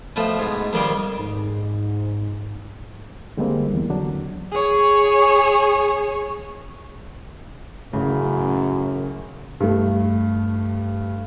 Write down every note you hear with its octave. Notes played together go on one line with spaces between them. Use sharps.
B2 F3 A3
G#2 B2
F2 D#3 G3 C6 D6
G#2
D3 G3 G#3 A#3 C4
E2
D3 F#3 D4
G#4 C#5
A1 F#2 C#3
G2 A3